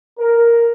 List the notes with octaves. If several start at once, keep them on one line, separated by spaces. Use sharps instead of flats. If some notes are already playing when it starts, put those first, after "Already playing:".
A#4